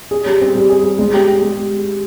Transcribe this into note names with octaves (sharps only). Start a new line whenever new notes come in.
G#4
G3
C4
G3
G#4
G#4
G#3
G4
G4
G#3